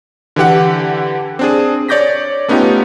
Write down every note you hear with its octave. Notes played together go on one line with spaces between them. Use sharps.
D3 E3 G4 F#5
C4 D4 G#4
C#5 D5 D6 G6 A#6 B6
A3 B3 C#4 D#4 F4 G4